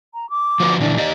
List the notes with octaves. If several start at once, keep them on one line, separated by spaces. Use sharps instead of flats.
A#5
D6
F3 F#4 B4
A#2 D3 E3 D5
D#4 G4 D#5